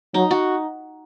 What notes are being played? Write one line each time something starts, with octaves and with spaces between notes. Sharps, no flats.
F#3 D#4
F#4